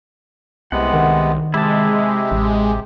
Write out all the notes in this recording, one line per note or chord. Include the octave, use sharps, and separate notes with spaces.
C2 C3 G#3 B3 F#5
D#3
C3 G#3 E4 G4 A5
A1